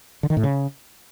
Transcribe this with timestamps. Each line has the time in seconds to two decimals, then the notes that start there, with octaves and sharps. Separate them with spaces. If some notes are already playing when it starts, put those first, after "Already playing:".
0.23 D3
0.30 D#3
0.37 A2
0.43 C#3